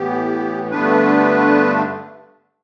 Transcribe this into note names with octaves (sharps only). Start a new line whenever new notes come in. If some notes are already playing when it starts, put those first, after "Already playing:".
Already playing: A2 E3 B3 G4
G2 D3 A3 B3 D4 B4